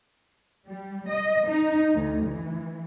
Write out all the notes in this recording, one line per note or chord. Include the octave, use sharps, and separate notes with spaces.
G3
D#5
D#4
D2
E3